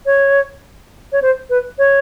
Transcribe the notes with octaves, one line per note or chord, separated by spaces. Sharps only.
C#5
C#5
C5
B4
C#5